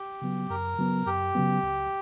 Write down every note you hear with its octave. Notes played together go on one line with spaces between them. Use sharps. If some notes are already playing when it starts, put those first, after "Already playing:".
Already playing: G4
C#3 F#3 B3
F#2 A#4
C#3 F#3 B3
F#2 G4
C#3 F#3 B3
C#2